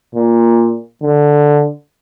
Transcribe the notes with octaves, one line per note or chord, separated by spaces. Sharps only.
A#2
D3